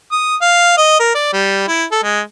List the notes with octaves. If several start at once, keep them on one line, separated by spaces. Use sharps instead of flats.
D#6
F5
D#5
A#4
D5
G3
E4
A4
G#3